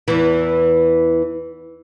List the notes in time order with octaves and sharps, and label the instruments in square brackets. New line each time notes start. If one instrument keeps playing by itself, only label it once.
[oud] E2 E3